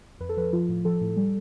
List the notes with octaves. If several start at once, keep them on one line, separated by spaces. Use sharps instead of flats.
F2 B4
A4
F3 B4
F3 F4
A2
F3 A4
A2
G3